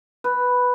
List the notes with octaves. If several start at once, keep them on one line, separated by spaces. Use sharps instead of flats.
B4